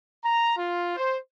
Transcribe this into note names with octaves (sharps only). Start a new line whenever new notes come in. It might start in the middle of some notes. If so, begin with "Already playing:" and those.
A#5
F4
C5